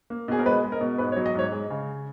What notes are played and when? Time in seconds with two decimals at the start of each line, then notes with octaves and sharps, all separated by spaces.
0.10 A#3
0.28 B2 G#4
0.39 A#4
0.46 G#3 B4
0.64 G#3
0.72 A#4
0.81 B2
0.98 G#2 B4
1.12 C#5
1.16 F#3
1.26 D#5
1.35 G#2 C#5
1.52 G#3
1.70 C#3